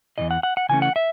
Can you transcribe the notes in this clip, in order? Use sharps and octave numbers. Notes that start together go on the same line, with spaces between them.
E2 C#3 E3 D#5
F#5
F#5
F#5
C#3 E3 A3 C#4 G#5
F#5
E5